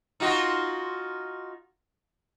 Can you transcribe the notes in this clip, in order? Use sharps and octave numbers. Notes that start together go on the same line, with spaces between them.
D#4 F4 F#4